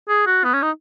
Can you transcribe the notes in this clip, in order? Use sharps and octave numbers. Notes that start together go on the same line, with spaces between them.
G#4
F#4
B3
C#4
D#4